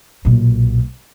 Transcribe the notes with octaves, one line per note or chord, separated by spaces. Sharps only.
B1 A#2